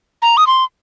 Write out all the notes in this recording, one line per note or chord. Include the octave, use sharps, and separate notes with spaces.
A#5
D#6
C6